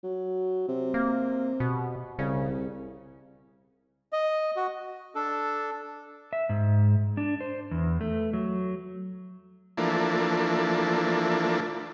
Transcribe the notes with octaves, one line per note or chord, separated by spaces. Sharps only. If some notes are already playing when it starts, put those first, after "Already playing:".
F#3
C3
A#3
B2
C2 C#3
D#5
F#4
D4 A4
E5
G#2
D4
C5
E2
A3
F#3
E3 F3 A3 A#3 D4